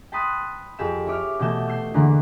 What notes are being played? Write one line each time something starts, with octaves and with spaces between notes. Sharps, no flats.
G5 A5 B5 C6 D#6 F#6
F2 G4 G#4 E6 E7
E4 C#5 D6 F6
B2 E3 A3 A5 G6 E7
E6 G6 C7
E2 D3 E3 A#3